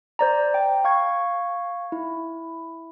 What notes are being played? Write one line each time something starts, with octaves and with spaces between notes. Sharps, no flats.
C5 D5 A#5
G5
F5 C#6 G#6
E4